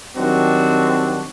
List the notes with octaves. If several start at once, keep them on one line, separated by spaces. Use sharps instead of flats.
D#3 F#3 G3 C4 D4 F#4